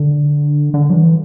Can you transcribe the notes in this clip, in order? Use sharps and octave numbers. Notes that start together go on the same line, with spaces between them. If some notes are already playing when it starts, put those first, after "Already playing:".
Already playing: D3
D3
F#3
E3